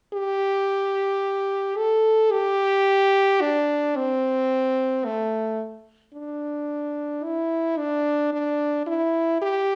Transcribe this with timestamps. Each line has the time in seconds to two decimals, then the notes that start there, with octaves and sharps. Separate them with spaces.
0.14 G4
1.77 A4
2.32 G4
3.41 D4
3.96 C4
5.05 A3
6.14 D4
7.24 E4
7.78 D4
8.33 D4
8.87 E4
9.42 G4